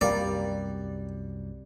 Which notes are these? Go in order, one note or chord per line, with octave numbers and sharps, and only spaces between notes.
C2 F#2 G3 A#3 A#4 D5 F5